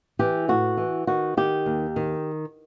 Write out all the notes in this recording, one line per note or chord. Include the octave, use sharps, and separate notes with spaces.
E3 G4
A2 F#4
E3
D#3 F#4
D#3 G4
D#2
D#3